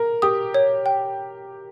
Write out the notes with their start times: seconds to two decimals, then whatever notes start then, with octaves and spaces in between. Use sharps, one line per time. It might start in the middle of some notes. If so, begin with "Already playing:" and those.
Already playing: A#4
0.22 G4 D#6
0.54 C#5
0.86 G5